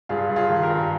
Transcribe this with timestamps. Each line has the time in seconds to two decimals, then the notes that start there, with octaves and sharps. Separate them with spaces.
0.09 G2 F4 G#4
0.30 G2
0.36 F4 G#4
0.49 D#3
0.63 G4 A#4
0.70 G2